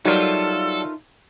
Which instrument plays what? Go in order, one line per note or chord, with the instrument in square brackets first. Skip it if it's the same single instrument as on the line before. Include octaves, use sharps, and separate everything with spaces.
[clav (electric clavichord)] F#3 G3 [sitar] A3 F4 A#4 [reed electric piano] D#4 [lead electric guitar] A4